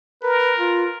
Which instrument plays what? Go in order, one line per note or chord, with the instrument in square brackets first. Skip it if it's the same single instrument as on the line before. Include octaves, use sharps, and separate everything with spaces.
[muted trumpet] A#4 [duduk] B4
[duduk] F4